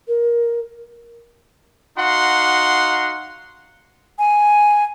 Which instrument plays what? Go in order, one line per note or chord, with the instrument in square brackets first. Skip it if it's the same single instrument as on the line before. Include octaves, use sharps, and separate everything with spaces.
[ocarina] A#4
[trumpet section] D#4 F#4 F5 F#5 C6
[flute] G#5